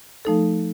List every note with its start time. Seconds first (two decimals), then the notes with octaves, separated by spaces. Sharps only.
0.25 F3 A3 D#4 A4